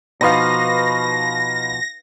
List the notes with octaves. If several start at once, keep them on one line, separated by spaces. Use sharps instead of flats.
B2 F3 D#4 B4 F5 A#6